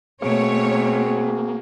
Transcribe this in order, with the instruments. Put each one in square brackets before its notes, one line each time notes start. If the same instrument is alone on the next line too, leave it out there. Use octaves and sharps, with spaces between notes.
[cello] B2 A3 [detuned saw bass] A#3 [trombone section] C4 F#4 G#4 [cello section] C#5